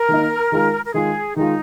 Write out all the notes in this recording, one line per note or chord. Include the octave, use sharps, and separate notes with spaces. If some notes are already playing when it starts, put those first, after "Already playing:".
Already playing: A#4
D#3 A#3 D#4
D#3 G#3 F4
A#4
D#3 G#3 F4 G#4
D#3 G#3 D#4 F4